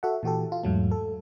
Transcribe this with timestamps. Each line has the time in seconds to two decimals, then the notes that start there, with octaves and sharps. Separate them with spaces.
0.03 F#4 A4 E5 F#5
0.23 A#2 E3 F#4 G4 A4
0.52 F4
0.63 E2 G#2 F#3 A3
0.91 A4